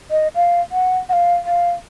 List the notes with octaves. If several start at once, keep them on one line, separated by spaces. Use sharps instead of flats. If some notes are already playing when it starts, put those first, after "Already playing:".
D#5
F5
F#5
F#5
F5
F5